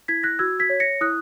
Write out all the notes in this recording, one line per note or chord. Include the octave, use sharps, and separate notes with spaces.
E4 G#6 B6
F#6 A#6
F#4 E6 G#6
G#6 B6
C#5
A#6 C#7
E4 D#6 F#6